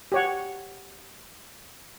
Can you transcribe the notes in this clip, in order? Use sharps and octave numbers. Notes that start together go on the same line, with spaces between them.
G4 C#5 F#5